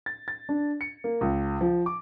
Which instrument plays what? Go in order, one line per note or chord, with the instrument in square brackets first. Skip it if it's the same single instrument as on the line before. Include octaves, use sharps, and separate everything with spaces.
[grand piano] A6
A6
D4
C#7
A#3
C#2
F3
D6